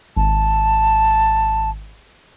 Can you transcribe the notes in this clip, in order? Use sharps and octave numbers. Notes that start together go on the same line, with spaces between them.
G#1 A5